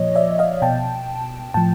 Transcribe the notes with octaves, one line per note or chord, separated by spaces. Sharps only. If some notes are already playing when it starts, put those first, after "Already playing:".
Already playing: A#2 F3 C#5 D#5
D5 E5
D#5 F5
B2 G5 A5
A2 F3 G5 A5